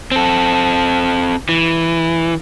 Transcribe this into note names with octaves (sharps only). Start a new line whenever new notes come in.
C4 A4
E3